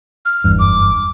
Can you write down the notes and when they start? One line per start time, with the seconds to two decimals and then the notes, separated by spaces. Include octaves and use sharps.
0.25 F6
0.44 F#1 E2 G2
0.59 D6